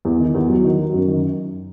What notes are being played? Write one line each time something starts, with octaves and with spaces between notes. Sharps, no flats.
E2
D#3
E2
F#3
D#3
F#3
F#2
D#3